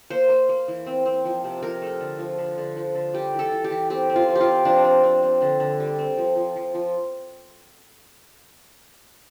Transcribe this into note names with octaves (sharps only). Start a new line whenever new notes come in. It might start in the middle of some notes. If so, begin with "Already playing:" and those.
A#3 C5
A#3
A#3
E3
C4
C4
F3
C3
F3 A#4
A3
D3
F3
D3
D3
F3
D3
G3 G4
E3
A4
E3
G4
E3
C4 G4
C4
F4
F3
G4
F4
C4
F3 D4
C4
C4
C4
D3
D3
G3
C4
F3
F3
F3
F3